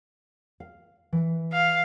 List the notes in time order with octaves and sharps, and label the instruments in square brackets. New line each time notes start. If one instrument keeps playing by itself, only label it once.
[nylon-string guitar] F5
E3
[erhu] F5